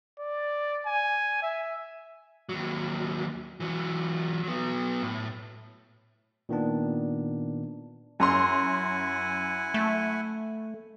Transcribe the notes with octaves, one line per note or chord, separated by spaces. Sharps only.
D5
G#5
E5
D#2 F#3
E3 F#3
F#3 B3
A2
A#2 D#3 B3 D4
F#2 E4 F#5 G#5 A#5 C6
A3